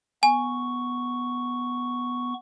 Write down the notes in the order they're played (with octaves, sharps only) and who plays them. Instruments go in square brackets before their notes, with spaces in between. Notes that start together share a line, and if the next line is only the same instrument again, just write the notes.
[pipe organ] B3 C#6 [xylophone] G#5